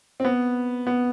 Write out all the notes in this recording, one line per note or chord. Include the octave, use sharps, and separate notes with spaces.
C4
B3
B3